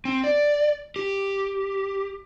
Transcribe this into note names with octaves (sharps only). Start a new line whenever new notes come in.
C4
D5
G4